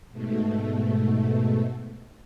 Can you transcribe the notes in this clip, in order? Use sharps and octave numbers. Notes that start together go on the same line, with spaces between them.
G#2 B2 A3